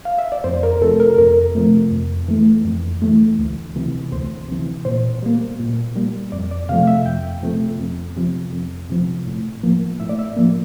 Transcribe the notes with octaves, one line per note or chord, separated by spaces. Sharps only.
F5
E5
D5
F2 C5
A#4
C3 F3 A3 A4
A#4
F2 A#4
C3 F3 A3
F2
E3 A3
F2
E3 A3
D2
C3 E3
D2 C5
C3 E3
A#2 C5
G3 A#3
A#2
G3 A#3
F2 D5
D5
C3 F3 A3 F5
E5
F2 G5
C3 F3 A3
F2
C3 F3
F2
C3 F3
A2
F3 A#3
A2 E5
D5
E5
F3 A#3